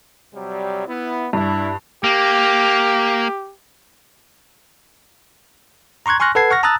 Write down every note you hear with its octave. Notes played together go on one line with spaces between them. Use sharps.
C3 F#3 G3
B3 E4
G2 D4 E4
A#3 G4
A#5 C6 C#6 F#6 G#6
G#5 C6 C#6 F6 F#6 A#6
A4 B4 F#5 A5 G#6 C7
F#5 C#6 F6 A#6
A5 A#5 D#6 E6 F#6 A6